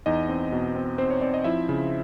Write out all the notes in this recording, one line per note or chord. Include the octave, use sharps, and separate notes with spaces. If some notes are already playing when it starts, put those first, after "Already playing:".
E2 D#4 D#5
C4
B2
C4
C4 C5
C#5
C4 D5
D#5
F3 E4 E5
C#3